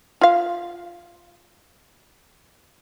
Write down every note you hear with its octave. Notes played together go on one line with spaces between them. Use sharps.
F4 F5